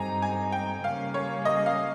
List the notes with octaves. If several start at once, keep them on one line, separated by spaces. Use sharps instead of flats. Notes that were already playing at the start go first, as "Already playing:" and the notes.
Already playing: G2 G3 C4 D#4 G#5 A#5
G#5
G5
C#3 G3 A#3 C#4 F5
C#5
D#5
F5